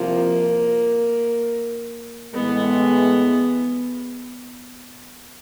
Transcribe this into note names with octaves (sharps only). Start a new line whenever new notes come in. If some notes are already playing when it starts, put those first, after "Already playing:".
Already playing: C2 C3 F3 A#3
A2 E3 G#3 B3